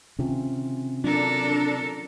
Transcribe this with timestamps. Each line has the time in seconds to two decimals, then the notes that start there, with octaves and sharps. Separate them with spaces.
0.19 C3 D#3 C#4 F4
1.04 F#3 D4 F4 A4 A#4